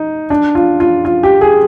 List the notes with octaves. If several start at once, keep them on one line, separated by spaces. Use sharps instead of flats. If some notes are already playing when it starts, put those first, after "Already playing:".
Already playing: D#4
D4
F4
F4
F4
G4
G#4